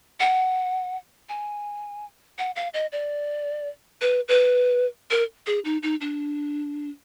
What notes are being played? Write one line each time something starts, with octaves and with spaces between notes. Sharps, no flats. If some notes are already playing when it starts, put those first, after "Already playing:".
F#5
G#5
F#5
F5
D#5
D5
B4
B4
A#4
G#4
D#4
D#4
D4